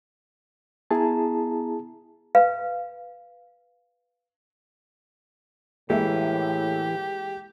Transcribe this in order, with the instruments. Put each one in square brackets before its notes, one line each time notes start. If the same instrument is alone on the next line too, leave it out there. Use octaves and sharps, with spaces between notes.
[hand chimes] B3 A#5 [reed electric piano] E4 G#4 A5
[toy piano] B4 F5
[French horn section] A2 [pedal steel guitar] E3 [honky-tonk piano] G#3 A#3 E5 [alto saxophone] G4